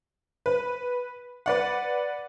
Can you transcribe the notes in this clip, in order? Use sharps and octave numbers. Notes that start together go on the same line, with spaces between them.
B4
B4 D5 F#5